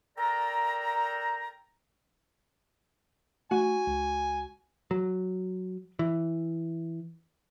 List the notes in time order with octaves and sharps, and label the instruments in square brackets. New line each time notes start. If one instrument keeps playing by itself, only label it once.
[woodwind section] A4 A#4 D5 G5 A#5
[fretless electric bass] A3 [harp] F#4 [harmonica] G#5
[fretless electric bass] C#2
[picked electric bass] F#3
E3